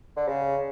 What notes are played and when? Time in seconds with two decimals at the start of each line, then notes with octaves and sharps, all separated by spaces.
0.17 D3
0.28 C#3